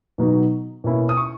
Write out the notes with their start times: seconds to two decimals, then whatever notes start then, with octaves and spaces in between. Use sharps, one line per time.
0.18 B2 F#3 B3 D#4
0.84 B2 A#3 C#4 E4
1.09 D#6
1.17 C#6